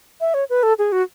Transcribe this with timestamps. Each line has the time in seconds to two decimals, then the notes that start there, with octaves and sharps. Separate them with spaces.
0.21 E5
0.34 C#5
0.50 B4
0.63 A4
0.79 G#4
0.92 F#4